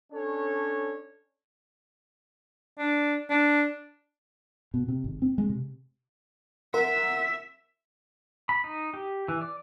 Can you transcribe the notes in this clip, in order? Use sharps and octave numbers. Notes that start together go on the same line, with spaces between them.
C#4 D4 A4 C#5
D4
D4
B2
C3
G#1
C4
G#3
C3
A#4 E5 F#5 C6
B5
D#4
G4
E3
D5